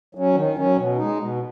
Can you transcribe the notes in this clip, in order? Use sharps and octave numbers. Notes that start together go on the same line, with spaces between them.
F#3 C#4
D#3
F#3 C#4
B2
G#3 D#4
B2